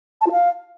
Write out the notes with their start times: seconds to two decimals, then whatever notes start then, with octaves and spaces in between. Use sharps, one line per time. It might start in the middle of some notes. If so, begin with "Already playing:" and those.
0.21 A5
0.26 F4
0.32 F5